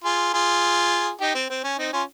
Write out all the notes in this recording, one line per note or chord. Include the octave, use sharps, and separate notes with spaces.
F4 G#4
F4 G#4
D#4 G4
C4
C4
C#4
C4 D#4
C#4 F4